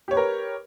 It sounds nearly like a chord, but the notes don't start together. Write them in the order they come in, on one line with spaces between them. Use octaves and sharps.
G4 C#5 B4 A#4